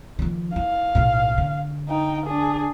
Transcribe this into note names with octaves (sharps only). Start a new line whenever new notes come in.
D#3 F3
E4 F5
B1 A2
D3
D#4 G5
D4 G#4